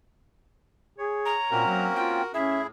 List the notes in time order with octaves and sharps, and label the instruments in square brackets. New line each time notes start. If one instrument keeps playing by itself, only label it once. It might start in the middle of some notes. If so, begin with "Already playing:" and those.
[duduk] G#4 [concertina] C#5
[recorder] A#5
[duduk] A#2 [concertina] A#3 C4 C#4 [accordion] F#4 A#4
[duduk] F#3
[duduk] F4 [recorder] G5
[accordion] A2 [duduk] C#4 [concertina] E4 G#4 [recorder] E5